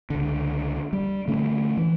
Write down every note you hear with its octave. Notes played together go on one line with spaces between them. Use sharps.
C#2 D3
G3
D3 A3 C#4
E3